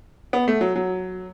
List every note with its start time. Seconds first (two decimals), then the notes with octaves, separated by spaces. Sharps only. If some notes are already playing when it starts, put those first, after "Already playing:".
0.33 B3
0.48 A3
0.61 F#3
0.76 F#3